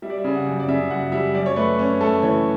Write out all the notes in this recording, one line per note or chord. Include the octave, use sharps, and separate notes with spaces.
G3 E5
D5
E5
C#3
F#5
F#2
D5
C#3 E5
F#2 F#5
G3 E5
F#2 D5
C#5
A3 B4
C#4
A3 A4
E3 C#5